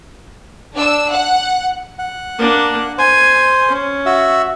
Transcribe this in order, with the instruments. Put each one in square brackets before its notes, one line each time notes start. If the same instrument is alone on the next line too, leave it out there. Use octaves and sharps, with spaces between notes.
[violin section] D4 E6
F#5
[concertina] F#5
[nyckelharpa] A#3 D4
[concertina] C5 [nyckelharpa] G#5
[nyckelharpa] C#4
[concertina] F#4 E5